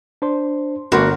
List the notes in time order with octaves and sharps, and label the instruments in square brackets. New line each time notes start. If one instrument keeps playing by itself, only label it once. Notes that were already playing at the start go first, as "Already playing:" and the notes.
[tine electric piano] D4 C5 C6
[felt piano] G1 A#4 C6 [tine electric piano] A3 [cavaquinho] F#4